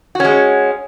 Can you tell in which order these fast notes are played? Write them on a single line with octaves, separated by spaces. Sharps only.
F#4 C#4 G#3